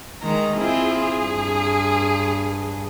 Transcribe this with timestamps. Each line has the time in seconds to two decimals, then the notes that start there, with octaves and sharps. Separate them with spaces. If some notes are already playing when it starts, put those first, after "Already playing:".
0.22 D#3 G#3 A#5
0.57 C4 E4 F4 G#4
1.18 G2